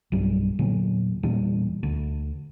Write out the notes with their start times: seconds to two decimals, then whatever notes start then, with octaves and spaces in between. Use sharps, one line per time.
0.12 B1 G2 G3
0.59 E2 A#2 D3 F#3
1.23 E2 A#2 E3 G3
1.83 D2